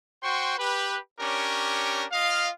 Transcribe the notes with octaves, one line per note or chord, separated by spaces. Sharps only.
F#4 C5 G5 C6 C#6
G4 B4
C#4 D4 G4 A#4 C#5
F4 D#5 F5